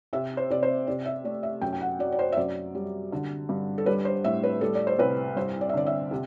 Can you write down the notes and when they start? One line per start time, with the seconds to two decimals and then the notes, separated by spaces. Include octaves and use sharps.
0.13 C3 E5
0.37 C5
0.50 C3 D5
0.63 C5
0.87 C3 D5
1.06 E5
1.24 A3 D5
1.43 E5
1.62 F#2 G5
1.73 G5
1.81 F#5
1.99 F#3 D5
2.12 D5
2.19 C5
2.32 E5
2.37 F#2 D5
2.75 G3
3.12 D3
3.49 G2
3.78 A4
3.86 G3 B4
4.05 C5
4.24 A2 E5
4.43 B4
4.61 G3 A4
4.75 D5
4.87 C5
4.98 C2 B4
5.36 G2 C5
5.61 D5
5.69 E5
5.74 D3 D5
5.87 E5
6.11 C3